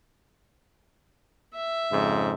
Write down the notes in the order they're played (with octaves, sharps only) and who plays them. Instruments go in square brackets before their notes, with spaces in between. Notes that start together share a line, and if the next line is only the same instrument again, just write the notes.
[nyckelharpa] E5
[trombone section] F2 G#2 C#3